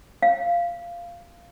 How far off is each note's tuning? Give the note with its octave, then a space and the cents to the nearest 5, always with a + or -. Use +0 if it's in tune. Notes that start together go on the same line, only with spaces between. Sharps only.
F5 -15